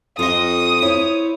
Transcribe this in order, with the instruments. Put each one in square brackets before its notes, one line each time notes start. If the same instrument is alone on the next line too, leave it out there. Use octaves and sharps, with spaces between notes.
[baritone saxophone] F2 [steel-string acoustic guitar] F4 D#5 [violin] D#6
[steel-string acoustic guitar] E4 C5 [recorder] C#5